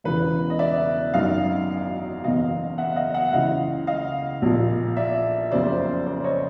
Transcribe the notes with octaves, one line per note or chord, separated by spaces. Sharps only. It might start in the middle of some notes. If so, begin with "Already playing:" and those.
E1 E2 C#3 E3 B4
D#5
D5 E5
G#1 F#2 D#3 D#5 F5
F#1 E2 B2 D#5 F5
E5 F#5
D#5 F5
E5 F#5
C#2 C#3 E3 D#5 F5
D#5 F5
A#1 A#2
D5 E5
F#1 F2 C#3 C5 D5
C5 D5
C#5 D#5